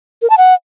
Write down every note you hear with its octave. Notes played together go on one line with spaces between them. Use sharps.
A#4
A5
F#5